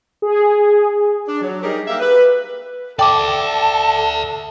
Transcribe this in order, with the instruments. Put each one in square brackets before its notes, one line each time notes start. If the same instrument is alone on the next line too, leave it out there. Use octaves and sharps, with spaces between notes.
[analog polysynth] G#4
[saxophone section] D4
F#3
G3 G#3 D#4 G4 G#4 A#4
A#3 G4 A#4 E5
B4
[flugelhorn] A4 [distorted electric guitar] D5 E5 [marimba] G5 D6 [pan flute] A5